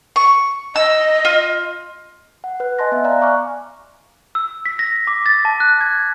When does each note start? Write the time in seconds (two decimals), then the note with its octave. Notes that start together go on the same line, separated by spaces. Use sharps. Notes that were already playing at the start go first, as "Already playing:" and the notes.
0.16 C#6
0.76 D#5 E6
1.25 F4
2.44 F#5
2.60 B4 F#6
2.78 D#5 G#5 A5 C6 F#6 A#6
2.92 B3 E5
3.04 D5 F5 A#5 F#6
3.21 G#5 A#5 C#6 D6 F6 F#6
4.35 E6
4.66 B6
4.79 A#6
5.07 D6
5.26 A6
5.45 A5
5.60 F#6
5.81 G#6